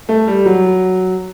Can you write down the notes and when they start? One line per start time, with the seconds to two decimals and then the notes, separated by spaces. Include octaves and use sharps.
0.09 A3
0.27 G3
0.46 F#3